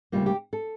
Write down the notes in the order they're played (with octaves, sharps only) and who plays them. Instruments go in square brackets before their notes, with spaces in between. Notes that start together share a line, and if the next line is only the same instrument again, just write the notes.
[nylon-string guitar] D2 C#3 G3 A#3 F4
G4
A4